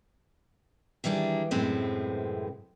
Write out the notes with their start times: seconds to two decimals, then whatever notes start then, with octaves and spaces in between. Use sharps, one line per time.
1.04 D#3 E3 G3 D4 G#4
1.51 F#2 A2 C3 G#3 C4 B4